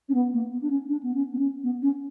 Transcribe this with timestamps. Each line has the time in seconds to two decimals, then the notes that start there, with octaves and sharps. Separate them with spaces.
0.08 C#4
0.14 B3
0.33 A#3
0.51 B3
0.61 D4
0.70 C#4
0.88 D4
1.02 B3
1.14 C#4
1.32 B3
1.38 C#4
1.63 B3
1.82 C#4